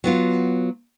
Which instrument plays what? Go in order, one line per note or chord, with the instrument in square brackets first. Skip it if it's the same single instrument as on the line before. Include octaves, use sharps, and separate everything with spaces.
[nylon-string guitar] F#3 B3 F4